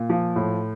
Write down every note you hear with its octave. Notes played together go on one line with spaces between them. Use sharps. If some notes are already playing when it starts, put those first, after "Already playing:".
Already playing: A#2
F3
A2